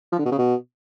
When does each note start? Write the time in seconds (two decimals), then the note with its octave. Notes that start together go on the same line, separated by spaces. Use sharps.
0.12 F3
0.19 D3
0.25 B2
0.32 C#3
0.38 B2